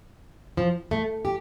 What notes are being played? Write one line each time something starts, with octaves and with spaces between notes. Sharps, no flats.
F3
A3
G4